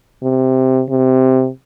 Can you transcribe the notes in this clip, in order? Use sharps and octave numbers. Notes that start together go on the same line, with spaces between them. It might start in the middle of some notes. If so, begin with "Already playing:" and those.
C3
C3